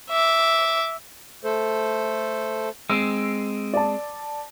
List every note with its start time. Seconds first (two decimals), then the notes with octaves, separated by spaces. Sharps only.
0.10 E5 D6
1.44 A3 A4 C5
2.90 G#3 C4 E6
3.74 D5 A5